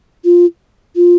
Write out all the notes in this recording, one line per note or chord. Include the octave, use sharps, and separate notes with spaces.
F4
F4